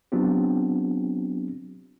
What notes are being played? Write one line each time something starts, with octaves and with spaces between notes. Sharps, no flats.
F#3 B3 C4 D4 F4 G4